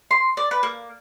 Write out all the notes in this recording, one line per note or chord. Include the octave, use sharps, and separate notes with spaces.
C6
D5
B4
A#3